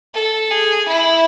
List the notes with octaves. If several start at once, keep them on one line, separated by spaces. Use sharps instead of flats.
A4
G#4
E4